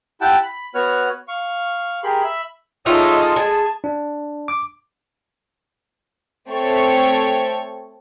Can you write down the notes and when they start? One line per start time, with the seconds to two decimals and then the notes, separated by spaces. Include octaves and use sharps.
0.21 E4 G4 F#5 G5 A5
0.43 B5
0.75 B3 F#4 B4 C#5 F#5 F6
1.28 F5 C#6
2.03 G4 G#4 A#4 B5 C6
2.24 E5 B5
2.86 G#3 D#4 F4 A4 C#5 D#5 E5 D#6
3.36 G#4 A5
3.84 D4
4.48 D6
6.49 A3 C4 A4 C#5 C#6